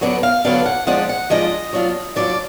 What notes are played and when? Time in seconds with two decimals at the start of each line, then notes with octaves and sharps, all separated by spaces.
0.01 D3 F#3 B3 D4
0.23 F5
0.45 D3 F#3 B3 D4 F5
0.66 F#5
0.87 F3 G#3 D4 F4 F#5
1.09 F#5
1.30 F3 G#3 D4 F4 D#5
1.73 F#3 D4 F4
2.16 F#3 D4 F4 D5